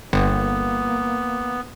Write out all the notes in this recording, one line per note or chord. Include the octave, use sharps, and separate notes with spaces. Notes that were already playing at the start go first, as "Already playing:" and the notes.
G1 A#3 B3